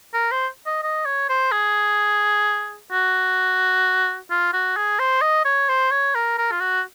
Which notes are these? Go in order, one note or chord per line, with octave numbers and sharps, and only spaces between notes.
A#4
C5
D#5
D#5
C#5
C5
G#4
F#4
F4
F#4
G#4
C5
D#5
C#5
C5
C#5
A#4
A#4
F4
F#4